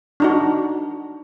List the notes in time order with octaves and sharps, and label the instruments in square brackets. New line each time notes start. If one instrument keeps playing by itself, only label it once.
[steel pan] D4 D#4 F#4